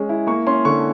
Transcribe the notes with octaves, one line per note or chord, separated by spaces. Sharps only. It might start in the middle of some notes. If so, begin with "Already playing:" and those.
Already playing: G#3 C#4
E4
A#3 C#6
C#4 C6
D3 C#6